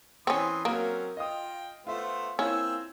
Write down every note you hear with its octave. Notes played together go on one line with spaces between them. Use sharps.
E3 C4 C#4 C6 C#6 D#6
F#3 A#3 C4 C#4 A#4 D#6
F4 D#5 F5 G5 D#6
A3 B3 F4 C5 E5
A#3 C4 C#4 E4 F4 G#5 E6